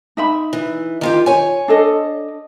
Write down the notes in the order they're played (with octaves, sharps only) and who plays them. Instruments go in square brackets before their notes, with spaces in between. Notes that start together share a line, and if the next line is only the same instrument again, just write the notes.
[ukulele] D#4 E5 B5
[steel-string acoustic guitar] E3
D#3 F4 G4
C#5 G#5
[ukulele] D4 A4 D#5